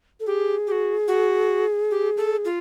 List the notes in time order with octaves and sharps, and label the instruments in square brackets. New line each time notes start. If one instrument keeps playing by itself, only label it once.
[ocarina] A4
[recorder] G4 [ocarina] G#4
[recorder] G4
F#4
F#4
G4
A4
F4